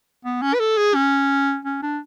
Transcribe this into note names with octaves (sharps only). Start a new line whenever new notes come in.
B3
C#4
B4
A4
G#4
C#4
C#4
D4